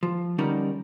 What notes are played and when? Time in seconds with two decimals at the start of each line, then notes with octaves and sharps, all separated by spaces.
0.03 F3
0.38 D3 G3 C#4 D#4 A#4 D5